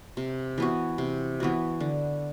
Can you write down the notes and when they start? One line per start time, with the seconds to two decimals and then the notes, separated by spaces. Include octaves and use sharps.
0.17 C3
0.58 E3 B3 F#4
0.98 C3
1.40 E3 B3 F#4
1.80 D3